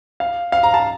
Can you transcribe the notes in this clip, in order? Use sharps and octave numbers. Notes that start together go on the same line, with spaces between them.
F5
F5
A#5
A5